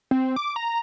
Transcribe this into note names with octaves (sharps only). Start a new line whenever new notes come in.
C4
D6
A#5